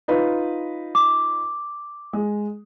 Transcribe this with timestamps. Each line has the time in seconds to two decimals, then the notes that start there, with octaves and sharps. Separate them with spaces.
0.08 D#4 F4 B4
0.95 D6
2.13 G#3